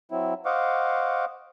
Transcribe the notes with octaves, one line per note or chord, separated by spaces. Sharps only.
F#3 C4 E4
C5 D#5 F5 F#5 C#6 D6